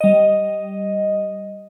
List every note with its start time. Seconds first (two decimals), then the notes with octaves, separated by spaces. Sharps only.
0.01 G3 D#5